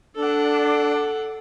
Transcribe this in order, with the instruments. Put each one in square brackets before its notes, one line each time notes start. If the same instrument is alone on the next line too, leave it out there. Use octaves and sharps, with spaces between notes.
[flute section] D4 [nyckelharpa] A4 F#5